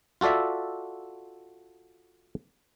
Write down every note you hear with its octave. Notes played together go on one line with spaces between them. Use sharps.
F4 F#4 A4 D5 E5